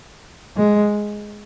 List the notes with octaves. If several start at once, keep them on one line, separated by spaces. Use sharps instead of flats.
G#3